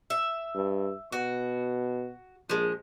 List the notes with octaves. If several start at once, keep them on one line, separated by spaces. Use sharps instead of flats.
E5
G2
B2 F#4
A#1 F3 G#3